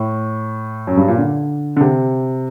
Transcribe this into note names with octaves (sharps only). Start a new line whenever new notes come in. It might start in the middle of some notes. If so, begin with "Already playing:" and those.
Already playing: A2
F#2
G2
A#2
D3
D3
C3